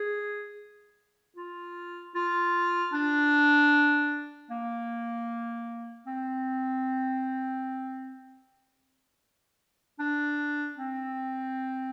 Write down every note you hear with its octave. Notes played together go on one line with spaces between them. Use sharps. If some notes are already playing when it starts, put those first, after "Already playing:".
Already playing: G#4
F4
F4
D4
A#3
C4
D4
C4